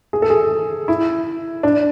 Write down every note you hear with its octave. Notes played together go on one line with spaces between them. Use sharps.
G#4
A4
G#4
E4
D4